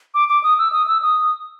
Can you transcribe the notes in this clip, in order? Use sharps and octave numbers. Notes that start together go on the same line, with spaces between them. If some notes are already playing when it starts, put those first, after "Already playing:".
D6
D6
D#6
E6
D#6
E6
D#6